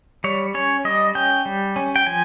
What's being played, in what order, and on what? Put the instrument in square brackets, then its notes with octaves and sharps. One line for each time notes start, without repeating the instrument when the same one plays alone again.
[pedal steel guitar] G3 C#5
C#4 C#5
G3 D#5
C#4 G5
G3
C#4
G5
F3 G#5